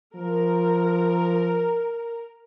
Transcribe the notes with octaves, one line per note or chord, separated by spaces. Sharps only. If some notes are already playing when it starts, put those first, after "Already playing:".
F3 A#4